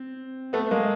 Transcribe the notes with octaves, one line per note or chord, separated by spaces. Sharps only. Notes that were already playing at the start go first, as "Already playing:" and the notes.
Already playing: C4
A3 B3
G#3 A#3